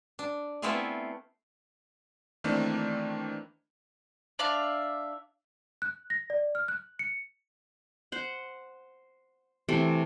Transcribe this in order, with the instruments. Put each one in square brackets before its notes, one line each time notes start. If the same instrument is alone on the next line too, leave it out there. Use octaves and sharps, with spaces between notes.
[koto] D4
A3 B3 C4 E4 F4 G#4
[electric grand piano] D#3 E3 A3 A#3 C4 D4
[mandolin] D4 D5 E5 F5
[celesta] F#6
A#6
D5
F6
F#6
C#7
[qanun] C5 F#5
C3 E3 A3 C4